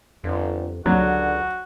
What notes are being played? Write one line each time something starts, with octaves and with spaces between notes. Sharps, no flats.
G1 F2
C#2 D3 F#3 F#4